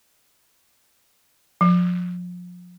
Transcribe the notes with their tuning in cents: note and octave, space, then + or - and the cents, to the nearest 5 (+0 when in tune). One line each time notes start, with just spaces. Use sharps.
F3 +30